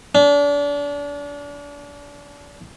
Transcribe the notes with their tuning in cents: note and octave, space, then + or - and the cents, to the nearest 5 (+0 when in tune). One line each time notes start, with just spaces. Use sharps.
D4 -35